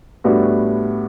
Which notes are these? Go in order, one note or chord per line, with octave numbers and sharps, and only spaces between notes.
A2 G3 B3 D4 F#4